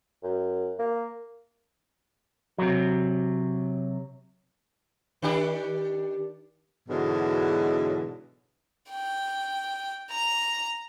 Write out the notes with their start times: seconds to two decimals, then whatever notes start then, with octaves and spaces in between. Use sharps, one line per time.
0.23 F#2
0.79 A#3
2.58 C3 F#3
5.22 D#3 D4 G4
6.89 G#2 B2 D3 E3 F#3 G#3
8.91 G5
10.11 A#5